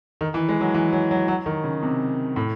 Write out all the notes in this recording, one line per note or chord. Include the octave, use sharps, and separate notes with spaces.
D#3
E3
G#3
F#3
E3
F#3
F#3
F#3
D#3
C#3
C3
A2